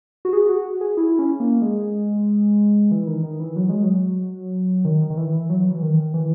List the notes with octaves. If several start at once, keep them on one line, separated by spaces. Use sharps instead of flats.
F#4
G#4
F#4
G#4
E4
C#4
A#3
G#3
E3
D#3
D#3
E3
F#3
G#3
F#3
D#3
D#3
E3
F#3
E3
D#3
E3